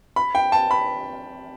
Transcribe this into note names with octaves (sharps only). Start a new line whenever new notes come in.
B5
G5
A5
B5